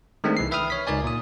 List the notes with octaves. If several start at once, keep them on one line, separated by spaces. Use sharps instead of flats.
D#3 G#3 A3 C4 D4
C2 E3 C7
B4 E5 G5 B5 D#6 F6
C#5 B6
C#2 D#4 A#4 D5 G#5
A#2 D#6